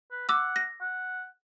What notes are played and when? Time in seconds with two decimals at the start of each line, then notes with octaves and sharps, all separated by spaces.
0.11 B4
0.29 F#5 D6 E6
0.56 A#6
0.81 F#5